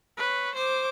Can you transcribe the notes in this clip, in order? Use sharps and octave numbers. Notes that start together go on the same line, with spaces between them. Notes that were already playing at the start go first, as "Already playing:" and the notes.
B4 C#5
C5 D6